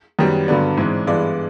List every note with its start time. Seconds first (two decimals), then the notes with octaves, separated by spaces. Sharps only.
0.19 F#2 D#3 G3 B3
0.48 G2 D3 F#3 B3 D5
0.77 G#2 E3 G#3 C4
1.07 G2 E3 G#3 B3 D5